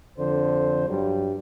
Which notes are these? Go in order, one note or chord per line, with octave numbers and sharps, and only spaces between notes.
F2 D3 C5
G2 F#3 G3